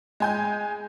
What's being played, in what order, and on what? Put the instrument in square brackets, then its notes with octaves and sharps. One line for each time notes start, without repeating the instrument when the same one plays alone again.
[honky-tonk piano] G#3 G#5 G6